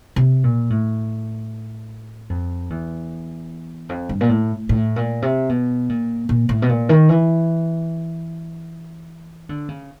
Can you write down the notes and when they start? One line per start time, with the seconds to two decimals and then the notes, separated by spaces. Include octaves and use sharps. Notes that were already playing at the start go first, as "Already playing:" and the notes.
0.16 C3
0.44 A#2
0.70 A2
2.30 F2
2.70 E2
3.89 F2
4.09 G2
4.21 A#2
4.29 A2
4.69 A2
4.96 A#2
5.22 C3
5.49 B2
5.89 A#2
6.29 A#2
6.49 A2
6.62 B2
6.69 A#2
6.89 D#3
7.09 E3
9.49 D3
9.69 C#3